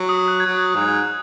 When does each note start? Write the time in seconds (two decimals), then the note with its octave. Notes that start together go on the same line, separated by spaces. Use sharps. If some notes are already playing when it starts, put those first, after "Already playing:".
Already playing: F#3
0.09 D#6
0.28 F#6
0.40 G#6
0.47 F#3 F#6
0.76 G#2